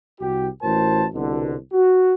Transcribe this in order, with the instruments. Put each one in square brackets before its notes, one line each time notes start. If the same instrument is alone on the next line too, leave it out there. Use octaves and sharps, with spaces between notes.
[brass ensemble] C2 F#4 G4
A1 A2 F#4 A#4 C5 A5
C2 B2 D3
F#4